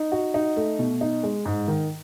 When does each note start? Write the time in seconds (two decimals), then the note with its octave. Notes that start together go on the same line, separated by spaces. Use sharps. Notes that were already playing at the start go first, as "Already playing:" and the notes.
Already playing: D#4
0.12 F#4
0.34 D#4
0.56 A3
0.79 B2
1.01 D#4
1.23 G#3
1.45 G#2
1.68 D#3